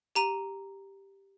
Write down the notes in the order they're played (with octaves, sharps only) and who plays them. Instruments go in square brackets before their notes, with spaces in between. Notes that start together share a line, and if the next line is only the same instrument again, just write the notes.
[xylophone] G4 A#5 D#7